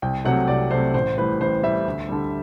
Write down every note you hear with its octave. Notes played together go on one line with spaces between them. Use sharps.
C2 G5
C3 F#3 A3 F#5
C2 D5
C3 F#3 A3 C5
A1 C5
A2 E3 G3 B4
A1 C5
A2 E3 G3 E5
D2
D3 G3